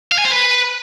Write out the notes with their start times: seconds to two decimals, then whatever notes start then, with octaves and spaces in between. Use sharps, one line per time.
0.12 F5
0.18 G#5
0.25 C5
0.31 B4